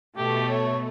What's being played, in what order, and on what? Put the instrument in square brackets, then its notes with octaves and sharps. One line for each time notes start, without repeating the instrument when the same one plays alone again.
[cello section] B2 [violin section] A3 [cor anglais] G4
[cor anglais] C#5